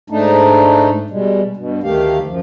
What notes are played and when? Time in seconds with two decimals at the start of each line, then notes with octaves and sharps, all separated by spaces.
0.10 G#2 A3 D4 D#4
1.10 B2 G3 G#3
1.57 G2 B2
1.83 D2 D#3 A3 G4 F5
2.28 F#2 F3